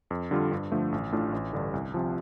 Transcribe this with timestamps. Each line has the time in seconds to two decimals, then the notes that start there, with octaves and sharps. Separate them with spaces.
0.11 F2
0.31 D3 G3 F4
0.51 G2
0.72 D3 F3 A3
0.92 A1
1.12 A2 A3 D4 F4
1.33 A1
1.53 G2 D3
1.73 C2
1.94 C3 F3